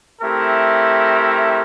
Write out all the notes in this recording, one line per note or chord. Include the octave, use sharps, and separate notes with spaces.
A3 C4 E4 G4 A#4